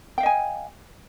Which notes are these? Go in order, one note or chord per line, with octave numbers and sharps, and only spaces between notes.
D#5 F5 G5 G#5